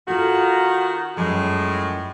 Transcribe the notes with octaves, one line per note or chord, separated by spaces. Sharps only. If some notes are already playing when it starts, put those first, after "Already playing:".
D#3 F4 F#4 A4
F#2 A2 F3 G#3